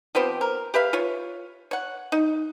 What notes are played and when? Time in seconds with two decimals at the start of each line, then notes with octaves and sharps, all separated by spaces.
0.15 F3 B3 C4 G4
0.41 A#4
0.74 G4 B4 E5 F5
0.93 F4 C#5
1.71 C#5 F#5
2.12 D#4